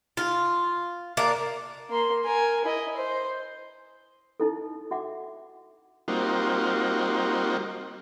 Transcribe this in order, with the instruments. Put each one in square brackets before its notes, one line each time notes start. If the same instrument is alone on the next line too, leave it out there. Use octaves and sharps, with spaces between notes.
[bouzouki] F4
A#3 D4
[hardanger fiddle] A#3 C6
A#4 G#5
E4 D#5
C5
[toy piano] D#4 E4 A4
F#4 E5 F#5 D6
[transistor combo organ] G3 A#3 C4 D#4 F4 F#4